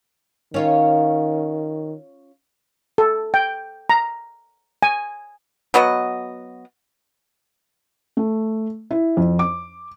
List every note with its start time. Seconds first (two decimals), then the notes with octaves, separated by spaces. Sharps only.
0.54 D#3 C#4 F4 C#5
2.98 A4
3.34 G5
3.89 A#5
4.83 G#5
5.74 F#3 B3 F#4 D#5
8.17 A3
8.91 E4
9.17 F2
9.39 D6